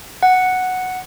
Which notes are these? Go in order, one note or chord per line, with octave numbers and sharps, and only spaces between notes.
F#5